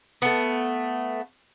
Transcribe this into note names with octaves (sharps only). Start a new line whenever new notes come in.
A3 B3